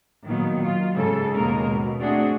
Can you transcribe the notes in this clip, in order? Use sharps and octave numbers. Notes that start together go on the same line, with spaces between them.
A#2 D#3 F#3 B3
F4
G#2 C#3 A4
D#2 B2 G#3 A#3 C#4 A#4
B2
A3 C4 D4 F#4 G#4